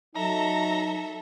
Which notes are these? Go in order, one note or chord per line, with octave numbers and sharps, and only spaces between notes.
F#3 D#4 A4 E5 A#5